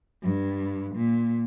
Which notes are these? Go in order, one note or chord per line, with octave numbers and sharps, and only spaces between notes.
G2
A#2